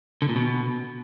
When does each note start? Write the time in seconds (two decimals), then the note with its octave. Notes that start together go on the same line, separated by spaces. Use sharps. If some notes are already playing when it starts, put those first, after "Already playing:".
0.22 D3
0.29 A#2
0.36 B2